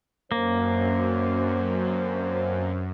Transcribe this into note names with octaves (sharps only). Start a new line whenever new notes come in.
F#2 D3 A#3 C4 C5